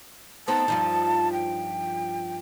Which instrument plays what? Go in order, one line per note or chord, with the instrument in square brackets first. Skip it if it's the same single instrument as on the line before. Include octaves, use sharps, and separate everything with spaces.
[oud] B3 C4 D#4 [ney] A5
[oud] G2 F3 D#4
[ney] G5